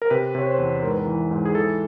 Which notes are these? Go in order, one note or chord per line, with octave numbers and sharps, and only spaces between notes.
A#4
C3 B4
C3 C#5
C5
E2
G#2 A#4
B4
A#4
E3
G#2
G#4
E3 A4